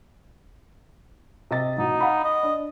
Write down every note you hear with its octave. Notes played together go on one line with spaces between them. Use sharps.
C3 D#5 A6
A1 B2 D#4
F5 F#5 B5
D#5
D4